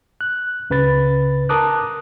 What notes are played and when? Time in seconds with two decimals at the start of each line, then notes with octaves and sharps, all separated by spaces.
0.21 F#6
0.70 C#2 C#3 B4 B5 A6
1.49 A#4 A5 A#5 D6 D#6 F#6